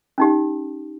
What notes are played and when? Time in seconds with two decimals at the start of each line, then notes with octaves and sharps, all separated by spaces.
0.18 C#4 D#4 G4